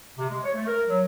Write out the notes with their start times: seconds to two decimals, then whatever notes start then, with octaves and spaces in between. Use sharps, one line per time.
0.19 C3
0.30 G#3
0.43 C#5
0.55 A3
0.67 A#4
0.87 F#3